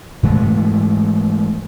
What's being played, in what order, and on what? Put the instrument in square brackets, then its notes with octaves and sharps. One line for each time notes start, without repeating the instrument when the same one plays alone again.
[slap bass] G#2 E3 G#3 A3